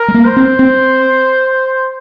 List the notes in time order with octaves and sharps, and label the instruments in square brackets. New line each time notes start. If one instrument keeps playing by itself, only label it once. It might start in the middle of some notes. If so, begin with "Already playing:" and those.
Already playing: [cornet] A#4
[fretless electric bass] G#3
A#3
[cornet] C5
[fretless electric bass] C4
C4